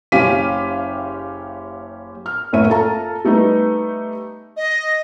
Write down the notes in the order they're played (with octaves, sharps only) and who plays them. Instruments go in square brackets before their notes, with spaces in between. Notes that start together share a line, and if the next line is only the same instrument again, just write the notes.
[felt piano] F#1 C#4 G4 F5 B6 D#7
F6
F#1 F#2 A2 C#5 E5 D#7
F4 A4 A5 A#5
G3 A3 B3 D#4
[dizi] D#5